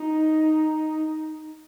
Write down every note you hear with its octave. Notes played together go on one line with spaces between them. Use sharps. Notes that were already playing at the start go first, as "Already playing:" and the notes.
Already playing: D#4